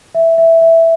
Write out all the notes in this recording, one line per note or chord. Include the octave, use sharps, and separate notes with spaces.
E5
E5
E5